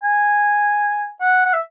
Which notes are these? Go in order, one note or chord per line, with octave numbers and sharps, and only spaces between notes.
G#5
F#5
F#5
E5